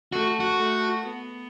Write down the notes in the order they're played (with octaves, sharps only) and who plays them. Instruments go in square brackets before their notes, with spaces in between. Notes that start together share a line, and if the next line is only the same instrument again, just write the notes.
[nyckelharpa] A3 [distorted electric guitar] F#4
[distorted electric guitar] F#4
[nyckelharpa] A3
B3